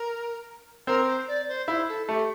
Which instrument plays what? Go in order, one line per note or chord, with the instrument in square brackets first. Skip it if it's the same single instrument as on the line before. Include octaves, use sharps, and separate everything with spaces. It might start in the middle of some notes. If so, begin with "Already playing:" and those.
Already playing: [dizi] A#4
[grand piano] C4 [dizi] A#4
[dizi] C5
D5
C5
[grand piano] E4 [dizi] C5
[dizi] A4
[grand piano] A3 [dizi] G4